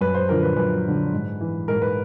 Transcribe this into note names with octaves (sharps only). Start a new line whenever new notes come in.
F#2 B4
C5
D3 F3 A#4
B4
F#2 B4
D3 F3
G#2
E3
G#2 A#4
B4